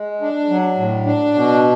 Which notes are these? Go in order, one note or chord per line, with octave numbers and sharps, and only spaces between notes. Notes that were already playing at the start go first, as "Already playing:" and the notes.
Already playing: G#3
D4
F#3
A2
D4
B2